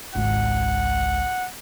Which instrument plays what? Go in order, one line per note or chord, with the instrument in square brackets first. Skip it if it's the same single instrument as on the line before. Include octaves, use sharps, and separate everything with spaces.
[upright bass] G#1 C#2 [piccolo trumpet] F#5